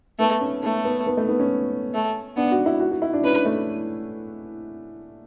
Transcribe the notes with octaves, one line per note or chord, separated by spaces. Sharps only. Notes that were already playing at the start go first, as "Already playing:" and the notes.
A3 B3
C#4
A3 B3
B3
B3
A3
B3
C#4
A3
B3 D4
F#4
E4
F#4
F#4
E4
D4
C#4 B4
A3